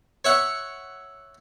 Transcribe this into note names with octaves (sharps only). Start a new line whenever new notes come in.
C#5 E5 F#5